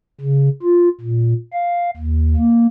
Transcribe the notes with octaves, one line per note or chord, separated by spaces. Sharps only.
C#3
F4
A#2
F5
D#2
A#3